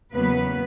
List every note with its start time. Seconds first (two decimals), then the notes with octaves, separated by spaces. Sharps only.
0.13 E2 C#3 F#3 A#3 B3 B4